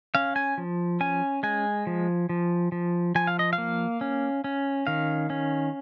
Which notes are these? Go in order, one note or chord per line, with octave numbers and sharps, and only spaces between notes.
C#4 F5
G#5
F3
C#4 G#5
G#3 G#5
F3
F3
F3
F3 G#5
F5
D#5
F5
A#3
C#4
C#4
D#3 F5
C#4